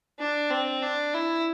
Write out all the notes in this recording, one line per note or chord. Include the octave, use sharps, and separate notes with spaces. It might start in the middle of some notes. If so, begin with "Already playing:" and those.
D4
C4
D4
E4